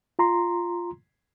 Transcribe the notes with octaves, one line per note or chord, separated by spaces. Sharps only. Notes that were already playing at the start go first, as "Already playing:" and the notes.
F4 A#5 C6